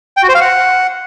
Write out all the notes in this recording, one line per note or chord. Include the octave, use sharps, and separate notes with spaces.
G5
F#4
C5
F5
F#5